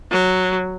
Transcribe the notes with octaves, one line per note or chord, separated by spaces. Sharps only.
F#3